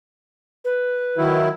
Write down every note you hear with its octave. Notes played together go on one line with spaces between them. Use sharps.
B4
D#3 F#3 E4